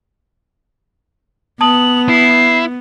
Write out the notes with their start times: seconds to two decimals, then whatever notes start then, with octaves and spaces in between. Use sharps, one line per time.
1.61 B3 A5 D#6 F#7
2.09 E4 C7